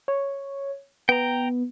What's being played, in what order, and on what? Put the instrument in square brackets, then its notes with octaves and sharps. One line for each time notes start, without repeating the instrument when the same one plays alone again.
[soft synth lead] C#5
[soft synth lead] B3 [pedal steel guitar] G5 A#5